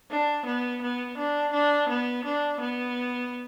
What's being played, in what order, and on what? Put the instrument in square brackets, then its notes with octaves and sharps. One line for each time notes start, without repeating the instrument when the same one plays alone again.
[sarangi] D4
B3
B3
D4
D4
B3
D4
B3